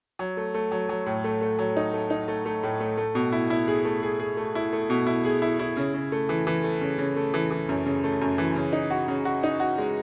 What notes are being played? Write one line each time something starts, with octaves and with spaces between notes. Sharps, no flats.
F#3
A3
A3
F#3
F#3
A2
A3
A3
F#3
D#4
A3
D#4
A3
A3
A2
A3
A3
B2
E4
E4
G#4
A3
G#4
G#4
A3
E4
A3
B2
E4
G#4
E4
E4
C#3
C#3
A3
E3
E3
A3
C#3
C#3
A3
E3
E3
F#2
C#3
A3
F#2
E3
C#3
D#4
F#4
C#3
F#4
D#4
F#4
G#3